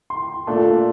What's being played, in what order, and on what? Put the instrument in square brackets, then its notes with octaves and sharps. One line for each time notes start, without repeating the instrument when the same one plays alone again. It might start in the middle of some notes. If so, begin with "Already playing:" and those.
[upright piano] C6
A#2 A3 D4